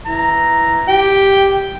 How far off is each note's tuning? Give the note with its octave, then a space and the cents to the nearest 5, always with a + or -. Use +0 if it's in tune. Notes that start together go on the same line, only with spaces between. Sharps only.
E3 +0 A#5 +0
G4 +0 G5 +0